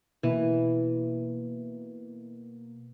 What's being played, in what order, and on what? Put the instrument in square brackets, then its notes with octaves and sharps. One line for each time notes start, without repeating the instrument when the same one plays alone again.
[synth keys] B2 A#3 [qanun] E3